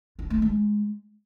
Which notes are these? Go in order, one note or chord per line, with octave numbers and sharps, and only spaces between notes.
F4
A3
G#3